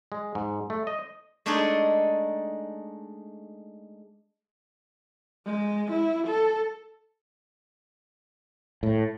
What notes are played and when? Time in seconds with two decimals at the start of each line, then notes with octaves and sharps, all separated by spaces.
0.12 G#3
0.35 G#2
0.70 A3
0.87 D#5
1.46 G#3 A3 D4 D#4 G#4 A4
5.46 G#3
5.92 E4
6.28 A4
8.83 A2